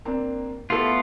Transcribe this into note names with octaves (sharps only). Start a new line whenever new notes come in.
A#3 C4 D4
A3 B3 E4 F4 A4